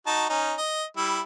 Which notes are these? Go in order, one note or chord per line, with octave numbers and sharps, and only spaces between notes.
D#4 F#4 A5
C#4 D#4
D#5
G3 E4